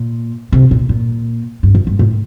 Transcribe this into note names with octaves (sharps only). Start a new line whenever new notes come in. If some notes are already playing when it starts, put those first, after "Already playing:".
Already playing: A#2
C3
A#2
A#2
G2
F#2
G2
A2